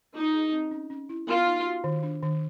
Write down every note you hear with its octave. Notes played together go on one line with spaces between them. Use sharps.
D#4 F4
G#4
C4
C#4
C#4
E4
B3 F4
D#4
F#4
D#3
D4
D#3